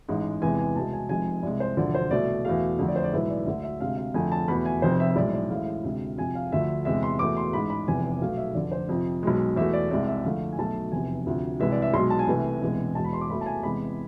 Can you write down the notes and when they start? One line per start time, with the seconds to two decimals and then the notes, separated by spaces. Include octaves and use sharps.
0.08 A1 G#2 G#3
0.42 E2 C3 E3 G#3 G#5
0.58 G#5
0.75 C2 B2 G#3 A5
0.93 G#5
1.09 F1 F2 C3 G#3 G#5
1.43 C2 C3 G#3 D5
1.60 C5
1.77 E1 D2 D3 F3 D5
1.95 C5
2.11 C2 B2 A3 D5
2.45 E2 B2 A3 F5
2.79 F2 D3 A3
2.88 D5
2.96 C5
3.04 D5
3.12 B1 A2 E3 G#3 E5
3.30 D5
3.46 D2 D3 A3 E5
3.63 E5
3.80 D2 C3 G#3 F5
3.97 F5
4.14 F2 D3 A3 G#5
4.32 A5
4.48 E2 B2 A3 B5
4.65 G#5
4.82 F1 F2 C3 C5
5.00 E5
5.16 B1 A2 G#3 D5
5.33 D5
5.50 A1 A2 G#3 F5
5.84 D2 C3 G#3
6.18 F2 C3 F3 G#5
6.35 F5
6.52 D2 D3 F3 A3 E5
6.85 E2 C3 G#3 E5
7.03 C6
7.19 E2 B2 A3 D6
7.37 C6
7.53 A1 G#2 G#3 B5
7.70 B5
7.88 F1 E2 C3 G#5
8.22 B1 B2 A3 F5
8.38 E5
8.55 F1 F2 D3 D5
8.72 C5
8.89 F2 C3 F3
9.23 B1 B2 G#3
9.56 E2 B2 A3 E5
9.73 D5
9.91 C2 C3 G#3 D5
10.07 E5
10.24 F2 D3 A3 F5
10.52 G#5
10.59 B1 B2 A3 A5
10.92 F1 E2 C3 G#5
11.27 D2 C3 F3
11.60 C2 C3 E3 G#3 E5
11.72 D5
11.82 E5
11.94 B1 B2 G#3 C6
12.10 A5
12.19 G#5
12.27 C2 C3 E3 A3
12.62 E1 E2 C3 G#3
12.95 E2 B2 G#3 A5
13.04 B5
13.13 C6
13.21 D6
13.29 C2 B2 A3 B5
13.41 A5
13.46 G#5
13.63 E2 C3 G#3 B5